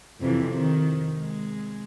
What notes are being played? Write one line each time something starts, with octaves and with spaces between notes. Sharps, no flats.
F2 C3 E3
D#3
G#3